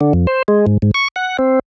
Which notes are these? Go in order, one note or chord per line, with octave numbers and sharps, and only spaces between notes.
D3
F2
C5
G#3
G#2
G#2
C#6
F#5
C4